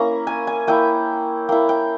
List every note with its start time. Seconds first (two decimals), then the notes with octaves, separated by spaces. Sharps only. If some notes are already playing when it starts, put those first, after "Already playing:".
Already playing: A#3 C#4 E4 A#5
0.27 G#5
0.47 G#5
0.67 A#3 E4 G5
1.49 A#3 E4 G5
1.69 G5